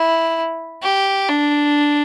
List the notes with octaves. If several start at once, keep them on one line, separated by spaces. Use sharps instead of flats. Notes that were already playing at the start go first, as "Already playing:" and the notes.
Already playing: E4
G4
D4